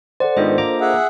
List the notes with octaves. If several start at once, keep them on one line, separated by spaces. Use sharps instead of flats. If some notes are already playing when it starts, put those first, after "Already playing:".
A4 C5 D5 F#5
G#2 D#3 B3 D4 F4 D#5
A#3 A#5 D6
G#4 E5 F#5